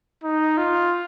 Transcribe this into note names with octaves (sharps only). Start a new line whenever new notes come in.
D#4
F4